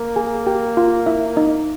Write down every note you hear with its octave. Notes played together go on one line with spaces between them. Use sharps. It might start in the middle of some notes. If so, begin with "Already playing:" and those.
Already playing: A#3
G#4 G#5
G4 G5
F4 F5
E4 E5
D#4 D#5